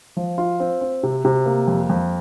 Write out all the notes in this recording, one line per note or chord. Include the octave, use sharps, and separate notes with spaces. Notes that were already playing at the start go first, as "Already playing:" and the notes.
F3
F4
C4
C4
C3
C3
A#3
F2
F2